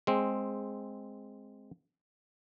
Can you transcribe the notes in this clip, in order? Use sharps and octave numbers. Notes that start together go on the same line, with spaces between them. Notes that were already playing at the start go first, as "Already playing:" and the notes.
G#3 C4